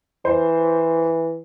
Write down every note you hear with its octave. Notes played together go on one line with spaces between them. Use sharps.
E3 C5